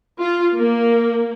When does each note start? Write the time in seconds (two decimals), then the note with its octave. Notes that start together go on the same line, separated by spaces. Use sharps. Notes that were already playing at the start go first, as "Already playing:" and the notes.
0.20 F4
0.55 A#3